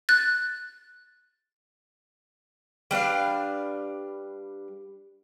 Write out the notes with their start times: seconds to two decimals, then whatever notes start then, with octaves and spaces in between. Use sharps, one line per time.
0.09 F#6 A6
2.91 G3 D4 B4 F5